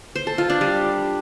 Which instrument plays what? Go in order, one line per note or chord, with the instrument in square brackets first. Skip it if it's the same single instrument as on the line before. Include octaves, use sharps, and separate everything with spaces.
[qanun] C5
A4
F4
D4
G3